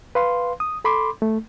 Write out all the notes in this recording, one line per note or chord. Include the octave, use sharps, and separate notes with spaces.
B4 F5 C6
D#6
A4 B5 C6 D6
A3